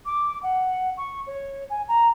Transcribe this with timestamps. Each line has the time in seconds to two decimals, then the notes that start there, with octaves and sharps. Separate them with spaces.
0.06 D6
0.43 F#5
0.98 C#6
1.27 C#5
1.70 G#5
1.88 A#5